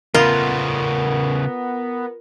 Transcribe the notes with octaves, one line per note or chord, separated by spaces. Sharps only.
C#3 A3 B3 F4 A#4